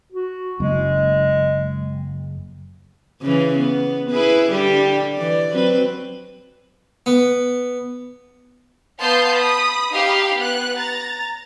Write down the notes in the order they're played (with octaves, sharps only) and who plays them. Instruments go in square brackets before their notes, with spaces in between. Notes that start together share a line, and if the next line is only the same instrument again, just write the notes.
[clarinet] F#4
[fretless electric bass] F#1 [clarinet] G#3
[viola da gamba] C#3 E3
B3
E4 G#4 B4
D3 G3 G4
E3 D5
F#3 C4 B4
[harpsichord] B3
[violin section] B3 F5 A5 C6 D#6 G6
B5 D#6
D#4 G4 F5 B5
B3 F#6
A#5 A6